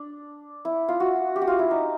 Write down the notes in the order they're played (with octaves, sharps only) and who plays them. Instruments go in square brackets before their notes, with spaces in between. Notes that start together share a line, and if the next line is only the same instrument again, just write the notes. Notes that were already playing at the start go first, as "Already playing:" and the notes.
Already playing: [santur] D4
E4
F4
F#4
G4
F#4
F4
E4
D#4